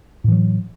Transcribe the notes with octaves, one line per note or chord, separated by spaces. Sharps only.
A2 E3 F#3